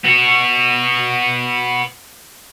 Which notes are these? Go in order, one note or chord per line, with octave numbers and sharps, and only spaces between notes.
B3 F#4